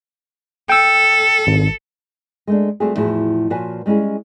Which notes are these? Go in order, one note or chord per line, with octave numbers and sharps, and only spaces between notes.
A4 G5 E6
G#1
G#3 A3 D4
G3 A3 C4 F4 F#4 G#4
E2 A2 F3 E4 F#4 G#4
A#2 F3 F#4 B4 C#5 G#5
G3 G#3 C#4 E4 G#4